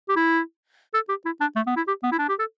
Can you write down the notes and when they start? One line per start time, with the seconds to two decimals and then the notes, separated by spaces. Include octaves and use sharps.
0.09 G4
0.16 E4
0.94 A4
1.09 G4
1.26 E4
1.41 D4
1.56 A3
1.67 B3
1.77 E4
1.87 G4
2.03 B3
2.12 E4
2.19 D4
2.29 G4
2.39 A4